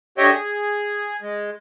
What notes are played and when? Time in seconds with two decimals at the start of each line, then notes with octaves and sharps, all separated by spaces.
0.18 D3 G4 C#5 D#5 E5 G5
0.33 G#4
1.22 G#3